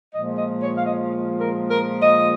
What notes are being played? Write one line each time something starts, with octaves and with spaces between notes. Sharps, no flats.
A#2 F3 G#3 D#5
D#5
C#5
F5
D#5
A#4
A#4
D#5